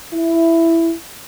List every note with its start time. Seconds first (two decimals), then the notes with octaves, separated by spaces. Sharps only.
0.14 E4